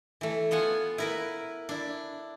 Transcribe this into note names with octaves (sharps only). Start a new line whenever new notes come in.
E3 A3
B3 F4 F#5 G#5
E4 A#4 B4
D4 E4